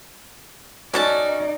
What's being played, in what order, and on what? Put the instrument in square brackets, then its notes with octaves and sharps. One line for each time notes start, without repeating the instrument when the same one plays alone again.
[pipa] C#4 A4 A5 [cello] D#4 D5 [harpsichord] F#4